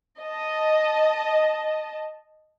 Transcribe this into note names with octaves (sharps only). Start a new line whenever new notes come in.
D#5 A5